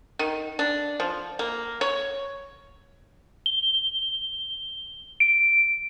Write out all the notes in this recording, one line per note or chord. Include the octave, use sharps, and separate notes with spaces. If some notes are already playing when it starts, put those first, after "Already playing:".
D#3
D4
F3
A#3
C#5
G7
D7